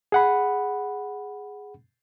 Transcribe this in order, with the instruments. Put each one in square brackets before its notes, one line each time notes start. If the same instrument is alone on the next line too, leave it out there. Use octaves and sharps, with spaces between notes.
[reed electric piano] G#4 F#5 B5